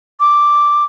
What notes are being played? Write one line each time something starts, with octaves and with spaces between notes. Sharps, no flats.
D6